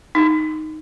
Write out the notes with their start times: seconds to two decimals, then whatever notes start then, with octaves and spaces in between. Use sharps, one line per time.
0.15 D#4